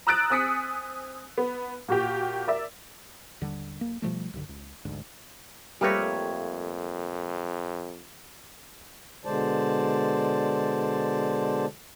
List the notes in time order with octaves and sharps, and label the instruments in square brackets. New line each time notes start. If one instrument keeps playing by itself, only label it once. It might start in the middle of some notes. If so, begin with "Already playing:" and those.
[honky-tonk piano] A#5 D#6 E6 F#6 A6 D7
C4 G#5 D#6 B6 C#7
B3
A#2 F#4 G4
A#4 D5 E5
[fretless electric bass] G#1 D#2 D3 G3
D1 A#3
B2 F3 G3 A3
B1 G2 D3
C#2
A1 D2 G#2
[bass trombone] F2 [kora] G3 B4 C#5 [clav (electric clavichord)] A3 A#3 G4
[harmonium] B2 D3 G#3 C5 D5 A5